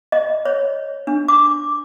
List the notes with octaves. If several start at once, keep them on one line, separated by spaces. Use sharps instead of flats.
D#5
C#5
D4
D6